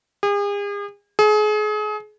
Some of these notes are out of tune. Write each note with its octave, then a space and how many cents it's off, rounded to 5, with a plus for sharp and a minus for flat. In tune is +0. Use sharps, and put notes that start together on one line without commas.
G#4 -40
G#4 +35